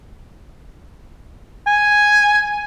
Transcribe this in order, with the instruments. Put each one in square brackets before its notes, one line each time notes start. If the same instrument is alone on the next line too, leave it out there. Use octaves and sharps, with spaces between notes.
[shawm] G#5